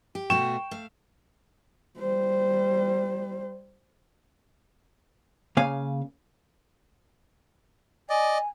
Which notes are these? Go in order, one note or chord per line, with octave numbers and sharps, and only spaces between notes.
G4
B2 A3 F#4 G5 C#6 E7
A3 F5
G3 C5
C#3 A#3 C#5 F5 G#5
D5 D#5 G#5